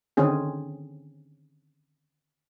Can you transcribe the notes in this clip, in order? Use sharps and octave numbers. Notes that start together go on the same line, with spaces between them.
D3 D#3 C4 C#4 G#4